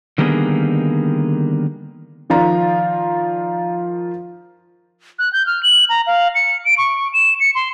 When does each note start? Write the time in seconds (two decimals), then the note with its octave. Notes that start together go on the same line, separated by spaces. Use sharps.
0.18 D3 D#3 G3 A#3 B3 G#4
2.30 D#3 F3 F4 D5 A#5
5.19 F#6
5.33 G6
5.47 F6
5.63 F#7
5.89 A#5
6.07 F5
6.35 C#7
6.65 D7
6.78 C#6
7.13 E7
7.40 C#7
7.55 C6